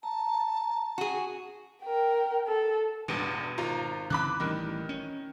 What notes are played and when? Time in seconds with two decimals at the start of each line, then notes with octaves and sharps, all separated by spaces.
0.03 A5 A#5
0.98 F#4 G#4
1.83 A#4 G5
2.47 A4
3.08 A1 E2 G2 B2
3.58 G#1 F4 A#5
4.10 C#3 E3 C4 B5 D6 F#6
4.40 A1 D#3 E3 G3
4.89 C#4